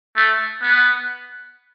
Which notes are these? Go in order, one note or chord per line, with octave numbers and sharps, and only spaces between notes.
A3
B3